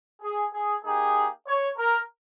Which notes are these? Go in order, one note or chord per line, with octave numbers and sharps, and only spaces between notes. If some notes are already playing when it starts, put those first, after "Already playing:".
G#4
G#4
A#3 D#4 G4 G#4
C#5
A#4